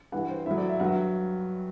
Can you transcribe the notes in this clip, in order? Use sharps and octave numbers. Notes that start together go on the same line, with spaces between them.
G2 E3 G3 F#5
C5
A2 F#3 E5
D5
E5
G2 F#3 F#5
E5